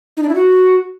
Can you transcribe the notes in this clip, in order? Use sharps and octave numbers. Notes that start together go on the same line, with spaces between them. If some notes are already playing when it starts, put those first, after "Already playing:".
D#4
D4
E4
F#4